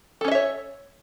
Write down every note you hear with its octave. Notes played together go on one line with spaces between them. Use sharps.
C#4 A4 C#5 D#5 E5